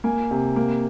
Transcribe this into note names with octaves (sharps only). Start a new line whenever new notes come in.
A#3 G#5
C3
A#3